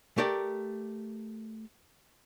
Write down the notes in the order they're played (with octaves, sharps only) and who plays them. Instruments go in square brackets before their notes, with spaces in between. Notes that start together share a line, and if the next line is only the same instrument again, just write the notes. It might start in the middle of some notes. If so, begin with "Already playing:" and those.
[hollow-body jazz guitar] A3 G4 A#4 D5